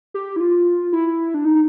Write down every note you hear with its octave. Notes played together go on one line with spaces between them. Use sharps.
G4
E4
F4
E4
D4
D#4